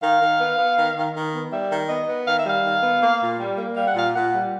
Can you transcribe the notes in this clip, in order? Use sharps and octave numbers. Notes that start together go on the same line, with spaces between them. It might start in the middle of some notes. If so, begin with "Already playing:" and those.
D#3 F5
D#3
B3
B3
D#3
D#3
D#3
B3
G3 E5
D#3
B3 D#5
B3
D#3 F5
E5
G3 F5
D#3
B3
A#3
A#2
G3
A#3
G3 F5
F#5
A#2 F5
A#2 F#5
G3